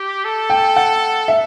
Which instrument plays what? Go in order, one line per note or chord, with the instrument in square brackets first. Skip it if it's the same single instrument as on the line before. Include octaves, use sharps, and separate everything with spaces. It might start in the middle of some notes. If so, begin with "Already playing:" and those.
Already playing: [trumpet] G4
A4
[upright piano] G5
F#5
E5